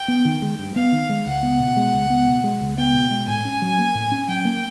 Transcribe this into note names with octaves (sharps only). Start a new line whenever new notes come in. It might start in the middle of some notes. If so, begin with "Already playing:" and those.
Already playing: G5
B3
D#3
G#3
G2
B3 F5
D#3
G#3
C#2 F#5
B3
B2
G#3
C#2
B3
B2
G#3
C#2
B3 G5
B2
G#3
A2 G#5
C#4
F#3
A#3
A2
C#4
F#3 G5
A#3